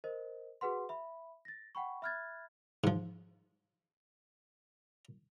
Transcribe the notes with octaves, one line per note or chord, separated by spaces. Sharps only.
A#4 C5 D#5
F#4 G#4 B4 F#5 C6
E5 B5
A6 A#6
F#5 G5 B5 C#6
E5 B5 F6 F#6 G#6 A6
G#2 F3